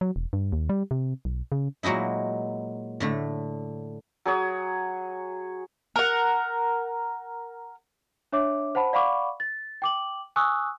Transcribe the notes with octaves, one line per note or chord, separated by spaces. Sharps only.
F#3
E1
G2
D#2
G3
C3
B1
C#3
A#2 F#3 G#3 D#4 E4
A2 D3 A3
F#3 G#4 C#5 D#6
A#4 F#5
D4 C#5 E5 D6
C5 F#5 A5 B5
D5 F5 F#5 B5 C#6 D6
A6
G5 D6 F#7
G#5 C#6 D#6 E6 F#6